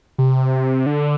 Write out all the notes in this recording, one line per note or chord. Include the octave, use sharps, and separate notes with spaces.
C3
D3